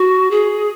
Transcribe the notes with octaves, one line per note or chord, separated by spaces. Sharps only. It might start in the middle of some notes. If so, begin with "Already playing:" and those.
Already playing: F#4
G#4